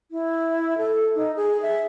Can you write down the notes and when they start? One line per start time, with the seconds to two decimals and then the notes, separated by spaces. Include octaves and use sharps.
0.11 E4
0.78 A4
1.15 D#4
1.36 G#4
1.62 E5